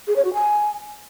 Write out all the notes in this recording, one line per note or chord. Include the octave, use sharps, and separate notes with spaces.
G#4
C#5
F#4
G#5